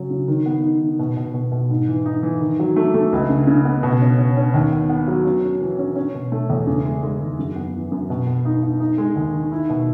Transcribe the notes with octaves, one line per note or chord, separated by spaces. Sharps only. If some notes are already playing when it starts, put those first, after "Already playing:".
Already playing: C#3 F#3 C#4
C#3
D#3
B3
D#4
D#3
B2
B2
B2
B2
G#2
E3
D#4
E3
D#3
F#3
A3
A3
C#2
C#3
C#3
B3
B2
C#4
C#4
C#4
D#2
B3
B3
F#3
C#4
C#4
E3
C#4
C#4
B2
A3
E2
C#3
G#3
G#3
D#2
F#2
B3
E3
F#2
B2
B3
D#4
D#4
D#4
G#3
D#2
D#3
E4
B2